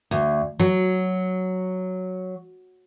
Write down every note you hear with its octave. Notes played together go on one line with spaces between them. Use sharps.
D2
F#3